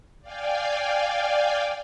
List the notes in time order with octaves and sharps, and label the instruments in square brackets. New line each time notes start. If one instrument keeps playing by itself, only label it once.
[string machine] D5 F5 G5 G#5